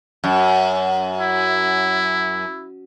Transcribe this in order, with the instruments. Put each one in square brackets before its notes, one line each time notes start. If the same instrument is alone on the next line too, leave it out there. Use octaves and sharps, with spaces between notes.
[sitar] F#2
[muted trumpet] E4